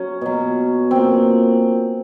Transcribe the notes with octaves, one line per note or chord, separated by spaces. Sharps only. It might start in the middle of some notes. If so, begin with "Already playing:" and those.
Already playing: F#3 C#4
B2 F#3
A#2 F#3 C4